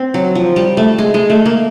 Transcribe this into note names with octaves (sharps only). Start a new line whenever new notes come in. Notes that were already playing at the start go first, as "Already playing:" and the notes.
Already playing: C4
F#3
F3
G3
A3
G#3
G#3
A3
A#3